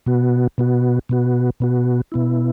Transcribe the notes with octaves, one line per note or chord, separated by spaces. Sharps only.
B2 B3 F#4
B2 B3 F#4
B2 B3 F#4
B2 B3 F#4
B2 B3 E4